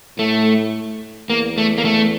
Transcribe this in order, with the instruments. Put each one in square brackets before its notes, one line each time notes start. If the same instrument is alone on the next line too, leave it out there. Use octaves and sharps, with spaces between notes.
[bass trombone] A2 [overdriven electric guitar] A3
[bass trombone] E2 [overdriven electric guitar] A#3
[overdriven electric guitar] A3
A#3
A3